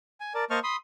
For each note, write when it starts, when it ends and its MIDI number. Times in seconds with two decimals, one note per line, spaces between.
0.20 0.33 80
0.34 0.44 70
0.34 0.44 74
0.34 0.44 81
0.50 0.60 58
0.50 0.60 72
0.50 0.60 75
0.50 0.60 81
0.50 0.60 85
0.50 0.60 89
0.64 0.76 83
0.64 0.76 84
0.64 0.76 87